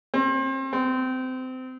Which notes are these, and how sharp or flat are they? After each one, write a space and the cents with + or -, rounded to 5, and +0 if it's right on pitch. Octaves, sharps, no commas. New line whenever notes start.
C4 +35
C4 -25